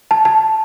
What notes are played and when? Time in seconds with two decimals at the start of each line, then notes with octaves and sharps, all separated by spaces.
0.11 A5
0.25 A5